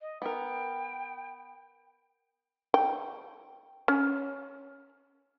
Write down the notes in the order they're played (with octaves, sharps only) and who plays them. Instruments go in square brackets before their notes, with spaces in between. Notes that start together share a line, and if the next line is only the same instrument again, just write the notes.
[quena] D#5
[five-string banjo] B3 A#4 [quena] G5
[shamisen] G5
C#4